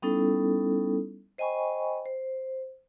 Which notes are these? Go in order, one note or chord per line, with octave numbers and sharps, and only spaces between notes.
G3 B3 C#4 D#4 E4 A4
C5 D#5 G5 G#5 B5 C#6
C5